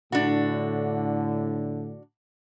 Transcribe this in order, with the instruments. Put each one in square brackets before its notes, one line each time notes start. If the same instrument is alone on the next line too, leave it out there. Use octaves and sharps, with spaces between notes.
[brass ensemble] A2 D3 [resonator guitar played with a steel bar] D4 F#4